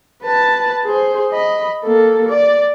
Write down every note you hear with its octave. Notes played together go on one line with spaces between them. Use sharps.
B4 A5
G#4 C5
D#5 B5
A#3 A4
D5